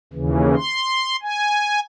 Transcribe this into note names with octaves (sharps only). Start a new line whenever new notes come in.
D#2 C#3 E3
C6
G#5